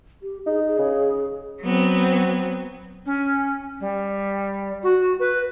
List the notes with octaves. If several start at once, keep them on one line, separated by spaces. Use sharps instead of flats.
G4
D#4 G#4
G#4
C#3
F#3 B3 C4
C#4
G3
F#4
B4